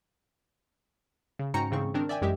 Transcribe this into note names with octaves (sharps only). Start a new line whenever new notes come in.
C#3
G#2 C#4 F#4 G5 A#5 C#7
A1 G#2 C#3 C4 C#6
D#3 C4 D4 A#4
D5 E5 G5 G#5
A1 F#2 G#3 G4 E5